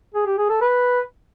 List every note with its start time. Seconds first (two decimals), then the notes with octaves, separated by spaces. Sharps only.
0.14 G#4
0.26 G4
0.38 G#4
0.49 A4
0.61 B4